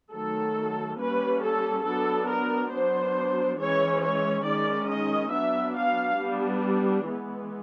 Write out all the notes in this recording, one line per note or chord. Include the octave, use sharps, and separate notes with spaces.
D#3 F#3 A3 A4
G3 A#3 C#4 B4
A4
F#3 B3 D4 A4
A#4
F#3 B3 D4 C5
E3 G#3 C#4 C#5
C#5
D#3 G#3 C#4 D5
D#5
F#3 B3 D4 E5
F5
G3 B3 D4
E3 G#3 B3